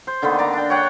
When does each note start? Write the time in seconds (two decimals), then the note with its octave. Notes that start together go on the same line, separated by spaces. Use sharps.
0.07 C5
0.22 D3 D#3 A#3 B3
0.39 D5 A#5
0.53 D4 G5
0.70 C#5 D5 F#5 G5